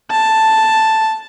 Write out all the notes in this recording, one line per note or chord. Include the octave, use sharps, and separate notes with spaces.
A5